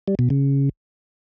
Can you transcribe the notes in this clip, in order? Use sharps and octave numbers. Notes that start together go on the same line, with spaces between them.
G3
B2
C#3